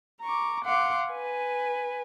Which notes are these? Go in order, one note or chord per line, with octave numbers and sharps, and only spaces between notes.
A#5 C#6 D6
F5 F#5 C6 D6
B4 G#5